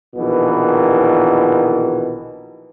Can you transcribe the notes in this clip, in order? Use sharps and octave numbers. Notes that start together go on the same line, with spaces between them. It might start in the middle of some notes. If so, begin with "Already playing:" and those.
A#1 B2 D#3 E3